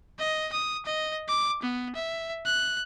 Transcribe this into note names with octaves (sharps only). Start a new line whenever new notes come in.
D#5
D#6
D#5
D6
B3
E5
F#6